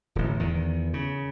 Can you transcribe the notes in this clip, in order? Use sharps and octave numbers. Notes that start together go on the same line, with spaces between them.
D1 A1
E2 D#3
C#3